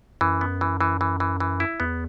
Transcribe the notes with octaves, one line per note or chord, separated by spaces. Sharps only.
F#2 E3
B3
E3
E3
E3
E3
E3
E4
E2 B3